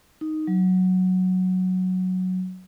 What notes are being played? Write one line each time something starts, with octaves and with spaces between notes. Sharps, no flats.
D#4
F#3